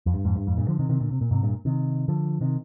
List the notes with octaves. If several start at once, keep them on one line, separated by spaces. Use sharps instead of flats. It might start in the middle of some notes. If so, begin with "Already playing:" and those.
F2
G2
F2 G#2
G2
F2 G#2
G2 A#2
D3 F3
C3 D#3
C3 D#3
A#2 D3
C3
A#2
G#2 C3
G2 A#2
C3 D#3
D3 F3
C3 D#3